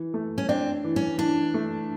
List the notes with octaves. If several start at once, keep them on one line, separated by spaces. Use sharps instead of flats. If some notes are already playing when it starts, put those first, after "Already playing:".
Already playing: E3
A3
C#4
C4 D4
E3
C#4
E3 D4
A3